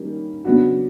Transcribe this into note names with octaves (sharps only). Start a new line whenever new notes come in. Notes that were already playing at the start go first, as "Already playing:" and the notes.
Already playing: D#3 G3 A#3 C#4
C#3 F#3 B3 D4 F#4